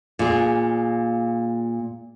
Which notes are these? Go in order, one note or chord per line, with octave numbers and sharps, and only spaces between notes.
A#2 G#4